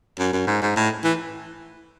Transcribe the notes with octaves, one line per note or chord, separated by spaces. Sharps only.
F#2
F#2
G#2
G#2
A2
E3